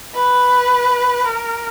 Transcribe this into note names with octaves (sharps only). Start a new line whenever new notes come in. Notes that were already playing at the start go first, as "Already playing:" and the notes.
B4
A#4